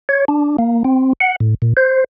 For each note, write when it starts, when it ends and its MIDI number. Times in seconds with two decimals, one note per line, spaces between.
0.09 0.25 73
0.28 0.57 62
0.59 0.83 58
0.85 1.13 60
1.20 1.36 78
1.40 1.54 45
1.62 1.73 46
1.77 2.04 72